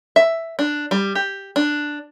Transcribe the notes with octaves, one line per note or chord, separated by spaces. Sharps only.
E5
D4
G3
G4
D4